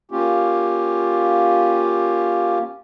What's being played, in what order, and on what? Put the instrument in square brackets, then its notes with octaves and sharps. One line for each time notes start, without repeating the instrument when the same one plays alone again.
[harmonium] A#3 C#4 F4 G4